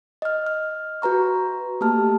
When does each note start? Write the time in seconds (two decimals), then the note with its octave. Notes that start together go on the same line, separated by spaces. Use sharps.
0.22 D#5 F6
0.46 F6
1.02 F#4 B4 A#5 C#6
1.81 A3 A#3 G4 A5 F6